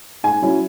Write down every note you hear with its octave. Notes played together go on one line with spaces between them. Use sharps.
G#2 G#5
F#3 C#4 E4